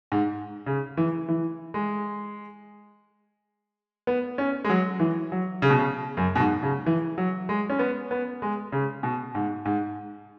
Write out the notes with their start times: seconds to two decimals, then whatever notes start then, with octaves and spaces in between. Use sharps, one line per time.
0.12 G#2
0.66 C#3
0.97 E3
1.28 E3
1.74 G#3
4.07 B3
4.38 C#4
4.65 G#3
4.70 F#3
5.00 E3
5.32 F#3
5.62 C#3
5.70 B2
5.79 C#3
6.17 F#2
6.35 B2
6.40 G#2
6.63 C#3
6.86 E3
7.18 F#3
7.49 G#3
7.70 C#4
7.79 B3
8.11 B3
8.42 G#3
8.72 C#3
9.03 B2
9.35 G#2
9.65 G#2